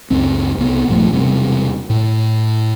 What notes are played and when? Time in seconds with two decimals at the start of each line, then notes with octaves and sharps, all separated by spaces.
0.10 C#2 F#2 C4
0.58 C2 B3
0.88 A#1 G2 F3 A3
1.12 E1 C3 G3 C4
1.90 A2